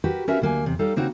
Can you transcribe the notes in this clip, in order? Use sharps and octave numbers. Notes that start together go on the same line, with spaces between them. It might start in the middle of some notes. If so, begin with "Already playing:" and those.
F#4 G4 A#4 B4
C#4 F#4 A#4 B4 E5 F5
D2 F#3 A#3 D#5 G#5
E2 C3
G3 D#4 A4 F5 A#5
C#3 A#3 C4 D#4 F#4